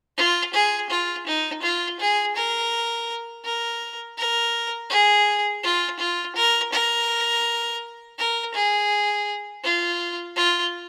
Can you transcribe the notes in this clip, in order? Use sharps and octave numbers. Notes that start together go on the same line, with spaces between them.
F4
G#4
F4
D#4
F4
G#4
A#4
A#4
A#4
G#4
F4
F4
A#4
A#4
A#4
G#4
F4
F4